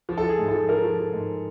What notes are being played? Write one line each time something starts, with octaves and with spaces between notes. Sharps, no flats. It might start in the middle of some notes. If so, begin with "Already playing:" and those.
F3
A4
F3
G#4
G#2
A4
F3
F3 A#4
F3
F3
G#2